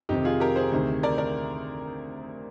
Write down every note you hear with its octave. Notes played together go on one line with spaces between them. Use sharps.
F1 F2 C3 D#3 D#4 G4
F4 G#4
G4 A#4
G#4 C5
D2 C3 D#3
A#4 D5
A#4 D5